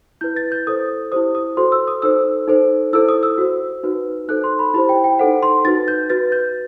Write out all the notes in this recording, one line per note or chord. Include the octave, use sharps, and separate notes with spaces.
E4 B4 G6
A6
G6
E4 A4 C5 D#6
E4 G4 C5 D#6
D#6
F#4 A4 C5 C6
E6
D#6
D#4 A4 C5 E6
D#4 A4 C5
E4 A4 C5 E6
D#6
E6
F#4 C5
D#4 F#4 B4
D#4 A4 C5 F#6
C6
B5
E4 G4 C5 B5
G5
G5
D#4 A4 C5 F#5
C6
D#4 F#4 B4 A6
G6
F#4 B4 A6
G6